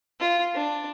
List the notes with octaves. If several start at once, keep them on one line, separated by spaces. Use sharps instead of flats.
F4
D4